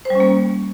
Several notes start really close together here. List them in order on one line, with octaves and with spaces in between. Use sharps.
C5 G3 C#4 A#3